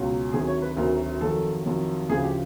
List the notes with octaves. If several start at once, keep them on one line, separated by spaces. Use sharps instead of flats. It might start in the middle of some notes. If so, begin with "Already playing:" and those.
Already playing: C#2 B2 F#3
D2 C3 D#3 F#3 G#4
C#5
B4
D2 C3 D#3 F#3 A#4
F2 C3 D#3 F#3 A4
F2 C3 D#3 F#3
D2 C#3 F3 G#4
G4